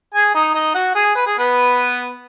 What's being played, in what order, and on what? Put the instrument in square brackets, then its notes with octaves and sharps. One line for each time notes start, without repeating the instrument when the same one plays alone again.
[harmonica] G#4 G#5
D#4 D#5
D#4 D#5
F#4 F#5
G#4 G#5
B4
G#4
B3 B4